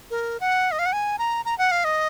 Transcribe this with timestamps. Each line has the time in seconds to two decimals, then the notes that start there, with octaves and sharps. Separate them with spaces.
0.11 A#4
0.40 F#5
0.72 D#5
0.79 F5
0.86 F#5
0.93 G#5
1.19 A#5
1.45 A#5
1.58 F#5
1.71 F5
1.84 D#5